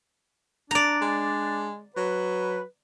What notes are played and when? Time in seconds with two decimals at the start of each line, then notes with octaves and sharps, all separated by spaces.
0.71 D4 D5 A#5
1.01 G#3
1.97 F#3 B4